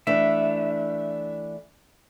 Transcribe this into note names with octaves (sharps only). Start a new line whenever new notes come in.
E3 A3 D4 E5